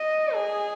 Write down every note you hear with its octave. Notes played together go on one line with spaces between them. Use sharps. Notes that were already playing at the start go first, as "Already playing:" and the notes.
Already playing: D#5
G#4